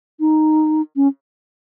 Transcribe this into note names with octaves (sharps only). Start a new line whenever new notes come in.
D#4
C#4